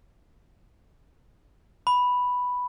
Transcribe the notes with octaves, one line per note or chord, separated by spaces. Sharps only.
B5